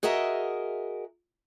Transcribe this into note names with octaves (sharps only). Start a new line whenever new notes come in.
F#4 G#4 A#4 D#5 E5